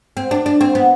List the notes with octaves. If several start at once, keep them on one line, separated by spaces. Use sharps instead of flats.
C4
D4
D4
C4
B3